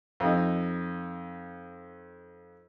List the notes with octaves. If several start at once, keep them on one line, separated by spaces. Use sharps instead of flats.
F2 D#4